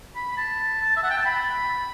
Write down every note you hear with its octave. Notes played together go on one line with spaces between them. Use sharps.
B5
B5
A5
A5
E5
F#5
G5
A5
B5